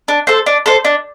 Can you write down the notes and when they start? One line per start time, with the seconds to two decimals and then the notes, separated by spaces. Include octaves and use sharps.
0.08 D4
0.27 A4 C5
0.46 D4
0.66 A4 C5
0.85 D4